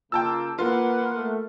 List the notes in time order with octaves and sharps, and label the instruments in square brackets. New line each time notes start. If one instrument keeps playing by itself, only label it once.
[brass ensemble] C#3 A#3 [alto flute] F4 [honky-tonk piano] G5 A5 E6
[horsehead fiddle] A#3 F#5 [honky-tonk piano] F4 [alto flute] A#4 [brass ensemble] B4
[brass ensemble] A3